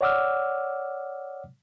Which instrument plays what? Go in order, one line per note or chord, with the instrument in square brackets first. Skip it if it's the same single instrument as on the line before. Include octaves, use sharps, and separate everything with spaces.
[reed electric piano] C#5 D5 F#5 D6 E6 F6